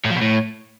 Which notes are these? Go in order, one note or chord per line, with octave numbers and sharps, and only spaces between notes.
A2
F3
B2
A2